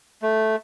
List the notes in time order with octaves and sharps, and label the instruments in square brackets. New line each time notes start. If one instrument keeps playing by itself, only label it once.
[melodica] A3